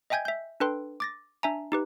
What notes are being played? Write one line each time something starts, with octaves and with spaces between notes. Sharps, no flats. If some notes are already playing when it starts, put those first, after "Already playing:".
D#5 E5 G5 G#5 G6 G#6
E5 G6
D4 A4 B4 G5 C6
D6 A6 A#6
D4 E5 G#5 A#5
D#4 G4 B4